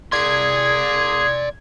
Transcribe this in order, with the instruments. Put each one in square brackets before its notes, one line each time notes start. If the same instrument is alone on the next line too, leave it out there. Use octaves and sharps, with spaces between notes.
[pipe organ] G#4 [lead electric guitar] D5 C6 [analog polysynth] G#6